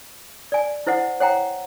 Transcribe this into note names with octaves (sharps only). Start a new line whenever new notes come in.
D5 G#5
E4 C5 D#5 F#5
C#5 F#5 G5 A#5